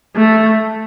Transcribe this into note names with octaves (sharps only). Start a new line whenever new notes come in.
A3